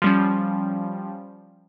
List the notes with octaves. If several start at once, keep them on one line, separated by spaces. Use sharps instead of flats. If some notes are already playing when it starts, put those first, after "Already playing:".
F3 G3 C#4